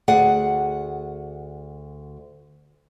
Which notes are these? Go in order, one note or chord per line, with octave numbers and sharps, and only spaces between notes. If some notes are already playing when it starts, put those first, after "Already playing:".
D2 G#4 D5 F#5